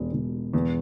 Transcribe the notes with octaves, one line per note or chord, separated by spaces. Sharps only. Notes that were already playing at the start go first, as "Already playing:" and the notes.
Already playing: E1 B2
E1
E2